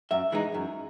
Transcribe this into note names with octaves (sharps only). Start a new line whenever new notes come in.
F#2 E5
E3 G#3 D#4
F#2